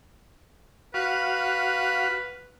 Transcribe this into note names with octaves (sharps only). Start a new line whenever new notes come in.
F#4 B4 F5